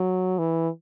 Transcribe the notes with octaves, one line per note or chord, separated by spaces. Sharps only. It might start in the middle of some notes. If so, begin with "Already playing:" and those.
Already playing: F#3
E3